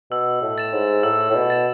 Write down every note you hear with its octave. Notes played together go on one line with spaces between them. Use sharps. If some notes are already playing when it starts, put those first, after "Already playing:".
B2 E6
A2
A6 E7
G#2
A2 E6
A2
B2
A6 E7